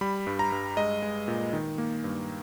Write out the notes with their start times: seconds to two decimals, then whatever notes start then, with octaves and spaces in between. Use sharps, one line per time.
0.01 G3 B5
0.27 G2
0.39 A#5
0.52 G2
0.77 G#3 D#5
1.02 G#3
1.28 A#2
1.53 D#3
1.78 A#3
2.04 G2